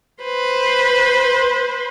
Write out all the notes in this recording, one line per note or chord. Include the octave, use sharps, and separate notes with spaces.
B4 C5